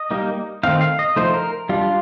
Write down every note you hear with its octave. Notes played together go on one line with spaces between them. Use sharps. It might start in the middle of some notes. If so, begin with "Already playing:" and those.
Already playing: D#5
G3 A#3 D#4
D#3 A3 C4 D#4 F5
F5
D#5
F3 A3 D#4 C5
A#4
G3 D4 F4